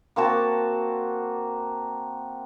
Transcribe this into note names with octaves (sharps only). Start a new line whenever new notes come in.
A#3 C4 F#4 A5